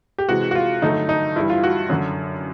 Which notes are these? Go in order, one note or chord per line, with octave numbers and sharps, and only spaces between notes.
G4
C3 E3 G#3 F#4
F#4
F4
G2 D3 F#3 A3 D#4
D#4
G2 E3 G3 E4
F4
F#4
F#2 D3 F#3